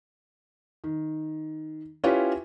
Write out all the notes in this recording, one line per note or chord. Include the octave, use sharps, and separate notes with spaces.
D#3
C#4 E4 F4 G4 B4 C#5